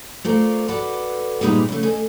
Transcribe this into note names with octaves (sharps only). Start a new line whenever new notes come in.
A3 C4 F4 A#4 D5
F#4 A4 B4 D5
A#2 G3 G#3 D#4 B4
C#3 A3
A4 D#5 G#5